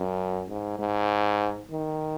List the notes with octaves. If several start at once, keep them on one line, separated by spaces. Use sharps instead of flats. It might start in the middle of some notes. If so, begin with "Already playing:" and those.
Already playing: F#2
G#2
G#2
D#3